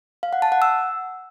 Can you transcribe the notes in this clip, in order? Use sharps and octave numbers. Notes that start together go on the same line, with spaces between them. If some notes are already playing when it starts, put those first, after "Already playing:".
F5
F#5
A5
F#5
E6